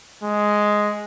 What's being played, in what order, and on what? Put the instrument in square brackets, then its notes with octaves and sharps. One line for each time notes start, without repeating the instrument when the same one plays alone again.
[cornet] G#3